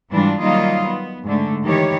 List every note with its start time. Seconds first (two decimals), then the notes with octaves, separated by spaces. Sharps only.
0.11 G#2 E3 G3 D4 F4
0.41 D#3 F#3 G3 A#3 F4 D#5
0.86 B3
1.24 G#2 D3 A3
1.65 D#3 E3 G4 C#5